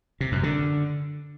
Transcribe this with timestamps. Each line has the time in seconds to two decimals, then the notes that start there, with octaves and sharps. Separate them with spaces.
0.21 C3
0.32 F#2
0.43 D3